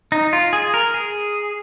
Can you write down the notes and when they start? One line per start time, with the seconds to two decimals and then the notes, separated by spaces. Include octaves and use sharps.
0.12 D#4
0.33 F4
0.53 G#4
0.74 A#4
0.94 G#4